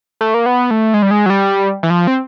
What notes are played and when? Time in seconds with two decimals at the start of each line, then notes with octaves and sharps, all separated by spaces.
0.21 A3
0.34 A#3
0.46 B3
0.71 A3
0.94 G#3
1.02 G3
1.11 G#3
1.26 F#3
1.30 G3
1.83 E3
1.90 F3
2.07 C4